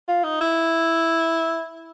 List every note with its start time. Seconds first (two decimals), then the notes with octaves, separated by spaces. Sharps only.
0.08 F4
0.24 D#4
0.41 E4